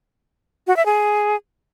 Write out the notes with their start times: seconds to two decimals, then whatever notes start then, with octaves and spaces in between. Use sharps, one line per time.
0.67 F#4
0.77 E5
0.86 G#4